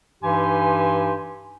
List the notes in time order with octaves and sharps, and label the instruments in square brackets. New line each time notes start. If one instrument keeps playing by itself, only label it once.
[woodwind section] G2 E3 D#4 G4 G#5 C6